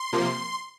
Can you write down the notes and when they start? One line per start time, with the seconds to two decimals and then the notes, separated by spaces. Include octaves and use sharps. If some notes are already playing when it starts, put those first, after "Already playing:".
Already playing: C6
0.13 C3 F3 A#3